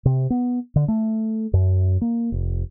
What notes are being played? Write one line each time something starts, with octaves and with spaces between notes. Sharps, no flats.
C3
B3
D3
A3
F#2
A#3
F1